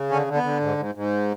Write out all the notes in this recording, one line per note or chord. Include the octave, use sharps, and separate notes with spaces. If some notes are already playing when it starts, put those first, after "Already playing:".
Already playing: C#3
D3 C#4
D3
B3
D3
G#2
G#2
G#2